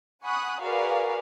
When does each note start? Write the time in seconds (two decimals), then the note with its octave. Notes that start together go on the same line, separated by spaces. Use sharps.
0.24 F#5 G#5 B5 C#6 D#6 F#6
0.62 F#4 G#4 A#4 B4 D5 F5